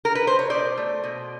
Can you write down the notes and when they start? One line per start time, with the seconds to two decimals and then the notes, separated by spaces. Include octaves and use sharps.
0.05 A#4
0.15 B4
0.27 C5
0.39 C#5
0.50 B2 C5 D5
0.77 A3
1.04 B2